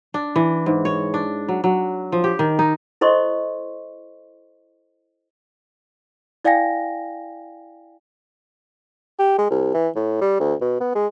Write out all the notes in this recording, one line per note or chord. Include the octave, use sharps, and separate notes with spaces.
D4
E3
G#2
C#5
D4
F#3
F#3
F3
G4
D#3
D#4
E4 A4 C5 D#5 C6 C#6
E4 D5 F5 G5 G#5 A#6
G4
G#3
C2
E3
A2
G3
D2
B2
B3
G#3